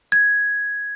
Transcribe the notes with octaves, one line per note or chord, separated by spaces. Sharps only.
G#6